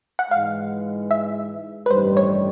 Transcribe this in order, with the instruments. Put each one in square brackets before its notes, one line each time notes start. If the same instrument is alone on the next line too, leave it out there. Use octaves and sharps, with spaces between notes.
[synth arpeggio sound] F#5
[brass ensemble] G#2 E3 G#3 [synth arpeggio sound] F5
[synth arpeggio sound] E5
B4
[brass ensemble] A1 G2 D#3 G3 [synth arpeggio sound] C5
[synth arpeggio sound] C#5